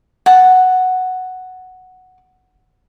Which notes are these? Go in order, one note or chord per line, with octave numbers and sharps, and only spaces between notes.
F#5 A5